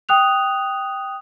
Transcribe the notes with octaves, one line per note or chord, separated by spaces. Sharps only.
G5 D#6 F#6 F7